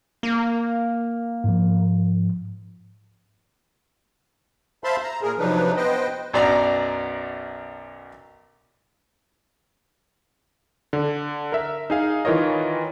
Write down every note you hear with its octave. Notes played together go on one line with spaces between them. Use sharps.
A#3
G#2 F3
C5 E5 F5 A5 B5 C6
A#5
A#2 G#4 A#4
C3 F3 F#3 D4 D#4 B4
B3 B4 C5 D#5 G5
B1 F#2 D4 D5 A#5
D3
A#4 E5
D#4 G#4 F5
D#3 E3 F4 A#4 C#5 D#5